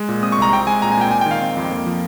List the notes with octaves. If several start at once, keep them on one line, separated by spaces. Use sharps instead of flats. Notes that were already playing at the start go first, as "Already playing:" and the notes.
Already playing: G#3
A#2
C4 D#6
C#6
C2 A#5
C4 G5
G#3 G#5
A#2 A#5
G#5
A#2 G5
G#3 G#5
G5
D#3
F5
C4
F2
A#3
F3